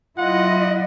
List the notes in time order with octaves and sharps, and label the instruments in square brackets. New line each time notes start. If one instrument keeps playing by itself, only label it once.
[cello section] F#3 E4 D#5 [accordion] F4 [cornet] F#5